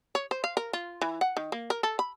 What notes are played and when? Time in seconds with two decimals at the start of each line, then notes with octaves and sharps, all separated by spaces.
0.15 C#5
0.31 C5
0.44 F5
0.57 A#4
0.73 F4
1.01 E3
1.21 F#5
1.37 D#3
1.52 A#3
1.70 A#4
1.83 A4
1.99 B5